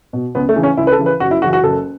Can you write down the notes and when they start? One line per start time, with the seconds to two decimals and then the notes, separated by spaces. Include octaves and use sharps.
0.13 B2
0.35 C#2 B3
0.49 A3
0.56 C#3 E3
0.63 C#4
0.77 C#2 E4
0.87 B4
0.92 A4
0.99 C#3 E3
1.06 B4
1.20 F#1 F#4
1.31 E4
1.42 F#2 C#3 E3 F#4
1.53 F#4
1.63 F#1 A4